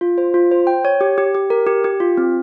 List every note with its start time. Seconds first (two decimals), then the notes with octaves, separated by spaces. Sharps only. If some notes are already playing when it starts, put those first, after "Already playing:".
0.01 F4
0.18 C5
0.34 F4
0.51 C5
0.67 G5
0.85 C#5
1.01 G4
1.18 G4
1.34 G4
1.50 A#4
1.67 G4
1.84 G4
2.00 F4
2.17 C4